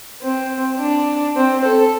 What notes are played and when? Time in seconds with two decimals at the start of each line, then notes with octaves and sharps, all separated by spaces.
0.22 C4
0.79 D4
1.36 C4
1.65 A4